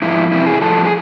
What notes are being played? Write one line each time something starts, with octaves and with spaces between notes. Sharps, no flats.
G#2 F3 E4
F2 C3 E3 E4
G#4
A2 F3 A4
G#4